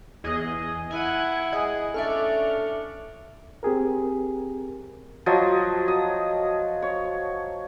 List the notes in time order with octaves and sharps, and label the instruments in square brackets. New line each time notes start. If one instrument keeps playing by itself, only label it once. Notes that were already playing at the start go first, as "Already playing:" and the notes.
[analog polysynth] E2 G#4 D#5
[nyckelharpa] E4 F#5 [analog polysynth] G#5
[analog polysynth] G#4 [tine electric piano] D#5 G#5
[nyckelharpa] C#4 D4 [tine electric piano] A4 E5 [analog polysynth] D5 C#6 F6
[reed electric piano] C4 G4 G#4 A#4
[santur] F3 F#3 D#5
D#6
C#5